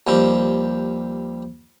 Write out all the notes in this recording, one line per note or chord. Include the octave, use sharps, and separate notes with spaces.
D#2 F3 G3 C4